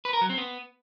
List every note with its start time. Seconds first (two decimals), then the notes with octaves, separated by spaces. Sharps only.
0.05 B4
0.13 A#4
0.21 F#3
0.30 C4
0.38 B3